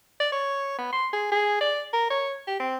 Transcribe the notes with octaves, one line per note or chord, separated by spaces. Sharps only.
D5
C#5
B3
C6
G#4
G#4
D5
A#4
C#5
G4
C4